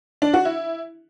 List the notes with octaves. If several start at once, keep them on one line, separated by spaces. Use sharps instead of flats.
D4
F#4
E4